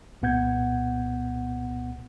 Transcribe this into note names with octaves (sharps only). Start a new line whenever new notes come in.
C2 A#2 B3 F#5 G6 G#6